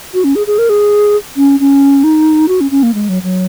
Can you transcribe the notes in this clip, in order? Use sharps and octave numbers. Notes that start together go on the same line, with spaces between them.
F#4
C#4
G#4
G#4
A#4
G#4
C#4
C#4
D#4
F#4
C#4
C#4
A#3
G#3
F#3
F#3